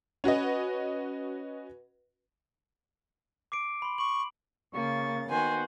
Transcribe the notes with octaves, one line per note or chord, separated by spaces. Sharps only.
C#4 F#4 B4 D#5
D6 C7 D7
B5 C6
C#6 F#7
C#3 A#3 C#6 A6
D#3 B3 F#4 C5 G#5